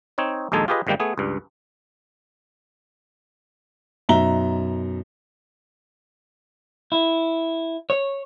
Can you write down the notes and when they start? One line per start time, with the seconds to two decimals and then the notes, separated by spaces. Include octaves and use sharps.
0.18 C4 D#4 C#5
0.52 A#1 D#2 G#3 D#4 A4 G#5
0.68 F4 G4 G#4 B4 D#5
0.87 G1 G#2 D#3 G3 A#3 G5
1.00 A3 B3 G#4
1.18 C#2 G2
4.09 F#2 B2 D#4 E5 A#5 G7
6.92 E4
7.90 C#5